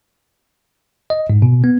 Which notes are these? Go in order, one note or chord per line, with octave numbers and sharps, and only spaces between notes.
D#5
G#2
B2
B3